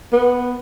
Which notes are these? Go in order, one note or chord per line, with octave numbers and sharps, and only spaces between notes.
B3